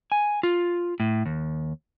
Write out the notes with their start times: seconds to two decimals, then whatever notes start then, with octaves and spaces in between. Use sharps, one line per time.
0.12 G#5
0.43 F4
1.00 A2
1.26 D#2